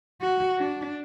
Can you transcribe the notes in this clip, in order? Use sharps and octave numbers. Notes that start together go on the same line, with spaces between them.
F#4
D4